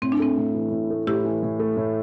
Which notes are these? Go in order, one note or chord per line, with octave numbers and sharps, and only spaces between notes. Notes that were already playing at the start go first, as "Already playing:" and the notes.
A2 C4
D4
A3 C4
A2
E3
A2
A3
A2 E4 G4
E3
A2
A3
A2